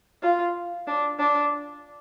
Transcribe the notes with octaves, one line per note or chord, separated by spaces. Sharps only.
F4
D4
D4